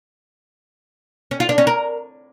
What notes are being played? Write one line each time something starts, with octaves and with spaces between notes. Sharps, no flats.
C#4
F4
D4
C#4
A#4